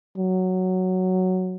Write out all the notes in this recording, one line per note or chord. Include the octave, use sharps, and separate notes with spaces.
F#3